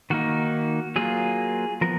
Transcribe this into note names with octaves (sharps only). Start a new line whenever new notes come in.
D#3 A#3 D#4 F#4
F#3 A#3 F4 G#4
F3 B3 A#4